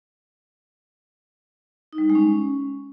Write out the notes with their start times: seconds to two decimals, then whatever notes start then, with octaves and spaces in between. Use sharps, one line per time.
1.93 D#4
1.98 G3
2.04 D#4
2.10 G#3
2.15 C#4